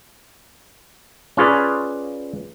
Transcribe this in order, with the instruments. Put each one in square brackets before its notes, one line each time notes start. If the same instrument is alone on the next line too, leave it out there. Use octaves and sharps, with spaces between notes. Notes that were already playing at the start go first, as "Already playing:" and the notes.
[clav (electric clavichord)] C#4 F4 G#4 B4 D5